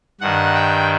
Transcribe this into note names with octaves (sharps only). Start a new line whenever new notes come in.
G2 D#3 F#5
G5